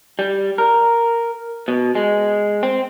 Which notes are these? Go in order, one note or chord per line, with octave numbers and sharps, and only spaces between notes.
G3
A#4
B2
G#3
C4